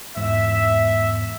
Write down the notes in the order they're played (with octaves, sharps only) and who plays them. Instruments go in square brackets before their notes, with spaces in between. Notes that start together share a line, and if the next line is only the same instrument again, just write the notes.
[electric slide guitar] E2 G#2 [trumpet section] E5